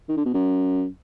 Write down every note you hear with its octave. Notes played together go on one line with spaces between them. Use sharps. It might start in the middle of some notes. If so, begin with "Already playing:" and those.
D#3
D3
B2
F#2